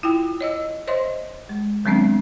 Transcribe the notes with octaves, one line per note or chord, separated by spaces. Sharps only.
E4 F4 G5
C#5 D#5 E6
C5 C#5 D#5 E5 C6
G#3
D#3 F#3 G#3 B3 C4 D4